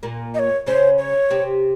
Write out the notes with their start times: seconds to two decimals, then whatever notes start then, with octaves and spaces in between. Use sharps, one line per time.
0.03 A#2 A#3
0.34 D#5
0.39 C#5
0.66 C#3 C#4 C5
0.98 C#5
1.30 C3 C4